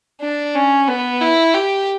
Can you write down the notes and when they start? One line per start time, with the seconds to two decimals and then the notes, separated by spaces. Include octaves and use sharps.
0.21 D4
0.55 C#4
0.88 B3
1.21 E4
1.54 G4